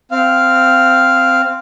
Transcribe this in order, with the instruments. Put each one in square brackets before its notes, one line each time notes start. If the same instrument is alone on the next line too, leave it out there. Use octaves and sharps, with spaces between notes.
[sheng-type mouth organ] C4 F5